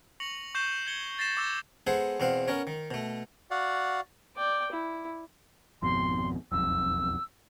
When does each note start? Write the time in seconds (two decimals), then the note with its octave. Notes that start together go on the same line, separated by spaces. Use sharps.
0.20 C#6 A#6 C#7 F7 F#7
0.55 C#6 G6 C7 E7 G7
0.87 G#6 C#7 G7
1.19 A6 A#6 C7 E7
1.37 D6 E6 G#6 G7
1.87 G#3 B3 G#4 A4 C5 F#5
2.20 E2 B2 C4 F5 F#5
2.48 B3 C#4 A#4 C#5
2.67 D#3
2.91 B2 A3
3.51 F#4 D5 F5 F#5
4.37 D5 G5
4.72 E4
5.82 G#1 F2 B2 C6
6.52 E1 B1 F2 E6